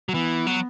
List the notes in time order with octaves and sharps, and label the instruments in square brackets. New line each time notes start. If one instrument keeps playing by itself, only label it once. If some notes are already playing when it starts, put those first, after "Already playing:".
[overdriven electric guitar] F#3
[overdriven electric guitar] E3 [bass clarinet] B3
[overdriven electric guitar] F#3